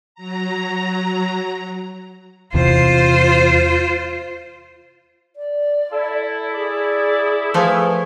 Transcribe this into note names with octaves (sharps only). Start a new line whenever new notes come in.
F#3 A#5
E2 C3 F4 C5
D5
E4 A4
G#4 D5
F3 A3 G#4 B4